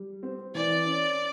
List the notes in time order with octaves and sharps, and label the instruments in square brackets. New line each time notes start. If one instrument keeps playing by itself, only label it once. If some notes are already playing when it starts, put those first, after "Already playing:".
Already playing: [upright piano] G3
C4
[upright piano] E3 [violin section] D5
[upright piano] C#4